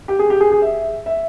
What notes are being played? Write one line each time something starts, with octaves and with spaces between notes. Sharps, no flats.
G4
G#4
G4
G#4
G#4
E5
E5